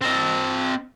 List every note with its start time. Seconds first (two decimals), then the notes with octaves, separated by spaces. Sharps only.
0.02 C4 D#5